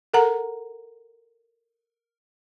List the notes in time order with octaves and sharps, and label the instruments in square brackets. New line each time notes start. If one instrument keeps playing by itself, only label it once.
[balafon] A4 A#4 F#5 A#5